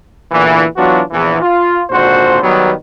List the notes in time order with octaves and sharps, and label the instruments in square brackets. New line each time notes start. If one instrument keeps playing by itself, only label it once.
[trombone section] E2 A#2 D3 E3
E3 F#3 B3 D4 F4 F#4
A#1 E2 E3
F4
G#1 A#2 D3 F#4 C5
D#3 F#3 G3 B3